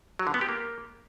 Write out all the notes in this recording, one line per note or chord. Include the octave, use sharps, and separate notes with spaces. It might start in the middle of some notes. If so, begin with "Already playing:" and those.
F#3
D3
B3
G4
A#3